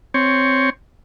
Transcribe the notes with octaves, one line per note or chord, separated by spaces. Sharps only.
C4 C#5